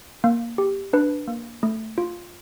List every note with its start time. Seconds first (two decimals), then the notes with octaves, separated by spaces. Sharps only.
0.24 A#3
0.58 G4
0.93 D4 B4
1.28 A#3
1.63 A3
1.98 F4